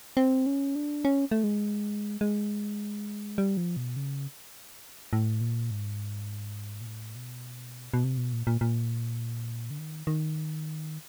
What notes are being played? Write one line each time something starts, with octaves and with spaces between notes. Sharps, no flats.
C4
C#4
D4
C#4
A3
G#3
G#3
G3
F3
B2
C#3
A2
A#2
G#2
A#2
A2
B2
B2
C3
B2
A#2
A#2
A#2
D3
D#3
D#3